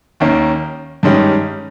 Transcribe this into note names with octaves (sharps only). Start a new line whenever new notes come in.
D#2 D#3 A#3 C#4
G2 D#3 G#3 C#4 G4